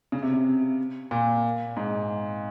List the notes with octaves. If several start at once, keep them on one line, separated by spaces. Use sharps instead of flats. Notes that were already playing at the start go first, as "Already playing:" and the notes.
C#3
C3
C3
A#2
G#2